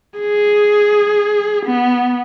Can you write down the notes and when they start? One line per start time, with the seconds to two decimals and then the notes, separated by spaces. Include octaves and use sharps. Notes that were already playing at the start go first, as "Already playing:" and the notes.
0.19 G#4
1.65 B3